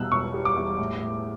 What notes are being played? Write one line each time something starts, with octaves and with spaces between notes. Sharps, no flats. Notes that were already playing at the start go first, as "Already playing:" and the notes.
Already playing: E2 B2 G3 E6 F#6
E1 C#6
G3
D6
E2
A2
A2